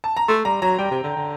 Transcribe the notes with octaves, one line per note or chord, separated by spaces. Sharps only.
A5
A#5
A3 C6
G3 A#5
F#3 A#5
G3 G5
C3
D3
D3